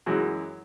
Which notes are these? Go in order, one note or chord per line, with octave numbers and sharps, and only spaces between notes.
F#2 E3 G#3 F#4